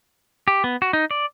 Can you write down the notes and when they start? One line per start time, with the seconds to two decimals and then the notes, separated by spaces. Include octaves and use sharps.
0.48 G4
0.64 B3
0.82 F#4
0.93 D#4
1.11 D5